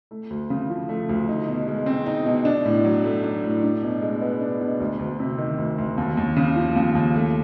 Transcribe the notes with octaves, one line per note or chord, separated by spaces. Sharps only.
A3
D2
C#3
F3
A3
D2
D#4
B2
G#3
C4
D#4
B2
D4
A2
F#3
A3
D4
A2
D4
B2
G#3
B3
D4
B2
D2
D2
C3
D#3
D2
D2
D#2
D#2
C#3
F3
D#2
D#2
A3